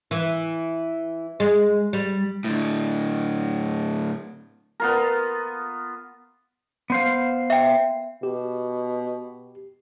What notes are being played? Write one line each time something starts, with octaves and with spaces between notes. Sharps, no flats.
E3
G#3
G3
A2 D3
B3 F4 A#4
B3 C5 F5
E5 G5
B2 G4